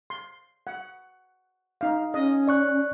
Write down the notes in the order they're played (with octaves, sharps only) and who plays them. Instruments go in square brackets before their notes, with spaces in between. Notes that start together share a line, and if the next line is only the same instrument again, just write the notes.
[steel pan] C6
F#5
D#4 F5
[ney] C#4 [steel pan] D#5
[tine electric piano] D5 C#6 F#6